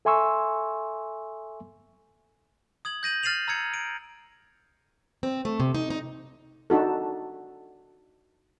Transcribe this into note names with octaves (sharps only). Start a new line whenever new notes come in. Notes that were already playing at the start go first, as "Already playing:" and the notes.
A4 E5 G#5 C6 C#6 E6
D#6 G#6 F#7
G6 A#6 D#7 F#7
F6 A6 C7 D#7 F7 F#7
A#5 E6 G#6 C#7
D7
C4
A3
C3
D#4
D#4
D4 D#4 F#4 A4